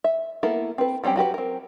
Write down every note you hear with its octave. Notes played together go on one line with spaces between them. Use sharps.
E5
A#3 B3 E4 A4 A#4
C4 A4 B4
F#3 G3 C4 C#4 G4
F#3 F#4 G4 B4
C4 A#4